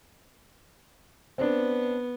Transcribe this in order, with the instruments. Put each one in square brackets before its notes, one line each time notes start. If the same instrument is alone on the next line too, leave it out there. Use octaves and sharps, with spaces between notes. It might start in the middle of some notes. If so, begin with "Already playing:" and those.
[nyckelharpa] B3 [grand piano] C4 D4